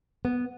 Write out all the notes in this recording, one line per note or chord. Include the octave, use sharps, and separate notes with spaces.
B3